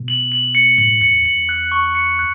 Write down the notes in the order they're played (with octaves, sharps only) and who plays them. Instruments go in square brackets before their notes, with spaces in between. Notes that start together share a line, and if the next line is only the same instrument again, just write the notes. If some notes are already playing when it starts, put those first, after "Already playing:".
Already playing: [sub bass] B2
[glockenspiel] F#7
F#7
C#7
[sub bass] A2 [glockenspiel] F#7
[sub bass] E2 [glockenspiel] C#7
[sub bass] E2 [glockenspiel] F#7
[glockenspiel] F#6
C#6
C#7
F#6